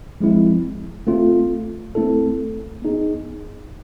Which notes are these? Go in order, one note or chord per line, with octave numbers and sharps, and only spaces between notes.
F3 G#3 C4 E4
A3 C4 F4 A4
A3 C4 E4 A4
B3 D#4 G#4